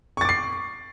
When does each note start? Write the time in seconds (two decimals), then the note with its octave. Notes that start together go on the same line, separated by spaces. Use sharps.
0.17 C#6
0.21 A6
0.25 D6
0.29 C7